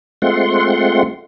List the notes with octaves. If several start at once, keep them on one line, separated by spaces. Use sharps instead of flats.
G#3 A3 C4 F4 F#5 C6